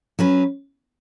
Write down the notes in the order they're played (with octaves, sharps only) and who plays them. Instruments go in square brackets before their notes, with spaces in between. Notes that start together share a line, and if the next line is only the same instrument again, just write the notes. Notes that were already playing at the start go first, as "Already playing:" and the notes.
[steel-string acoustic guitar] F#3 C#4 B4